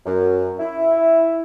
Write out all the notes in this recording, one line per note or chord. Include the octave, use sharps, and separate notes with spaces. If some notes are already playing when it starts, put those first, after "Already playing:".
F#2
E4